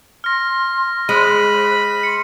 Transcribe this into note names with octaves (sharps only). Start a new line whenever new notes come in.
C6 F6 A#6
G#3 C5 B5 F#6 D#7
C6 C#7